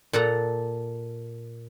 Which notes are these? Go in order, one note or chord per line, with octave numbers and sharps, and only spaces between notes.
A#2 A4 F#5 A#5